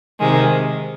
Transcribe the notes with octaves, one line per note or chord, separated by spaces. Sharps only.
C3 D#3 G#3